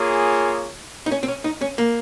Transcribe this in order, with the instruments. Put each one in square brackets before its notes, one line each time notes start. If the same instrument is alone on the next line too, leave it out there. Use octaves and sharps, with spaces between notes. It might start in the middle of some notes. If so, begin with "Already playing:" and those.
Already playing: [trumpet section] A#3 F4 G#4 C#5
[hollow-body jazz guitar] D#4
C#4
C4
C#4
D#4
C#4
A#3